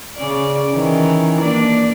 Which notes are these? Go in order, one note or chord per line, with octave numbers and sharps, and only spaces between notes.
C#3 C#4 D5
D#3 E3 C#4
A#3 D4 D5